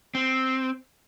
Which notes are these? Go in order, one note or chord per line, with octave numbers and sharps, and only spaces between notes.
C4